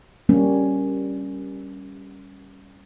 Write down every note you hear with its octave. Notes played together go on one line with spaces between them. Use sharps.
G3 A#3 C#4